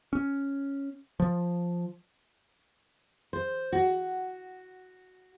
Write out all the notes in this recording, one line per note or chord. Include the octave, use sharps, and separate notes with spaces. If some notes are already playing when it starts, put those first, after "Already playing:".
C#4
F3
C5
F#4